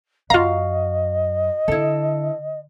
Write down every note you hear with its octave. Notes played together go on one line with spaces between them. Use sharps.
F#2 F4 F#4 D#5 F5 A#5
D3 E4 A4